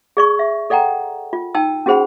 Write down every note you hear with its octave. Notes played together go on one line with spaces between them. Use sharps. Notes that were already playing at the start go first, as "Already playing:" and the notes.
G#4 D5 C#6
E5
A4 D5 F#5 G5 A#5
F4
D#4 G5 A5 E6
C#4 F#4 G#4 C5 F#5 B5